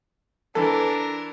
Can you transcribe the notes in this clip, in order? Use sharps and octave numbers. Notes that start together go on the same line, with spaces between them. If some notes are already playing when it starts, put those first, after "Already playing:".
E3 D4 A4 A#4